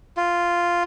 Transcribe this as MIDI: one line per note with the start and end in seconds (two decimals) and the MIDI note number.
0.17 0.83 65